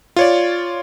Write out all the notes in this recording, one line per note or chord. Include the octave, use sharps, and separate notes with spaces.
F4 C#5 D5